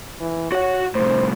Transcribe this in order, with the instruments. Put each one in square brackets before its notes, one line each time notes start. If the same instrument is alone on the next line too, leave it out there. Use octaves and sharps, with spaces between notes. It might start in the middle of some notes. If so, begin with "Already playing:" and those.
[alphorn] E3
[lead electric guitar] F#4 F#5 [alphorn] C#5
[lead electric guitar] C2 A2 [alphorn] C5